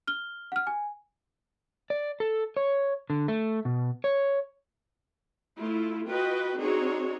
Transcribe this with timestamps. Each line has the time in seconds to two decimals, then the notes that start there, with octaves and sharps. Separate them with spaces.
0.07 F6 G7
0.52 F#5 F6
0.67 G#5
1.90 D5
2.20 A4
2.57 C#5
3.10 D3
3.28 A3
3.65 B2
4.04 C#5
5.57 A3 E4 F4
6.08 F4 F#4 B4 D#5 G5
6.57 C4 D4 D#4 F#4 G#4 C#5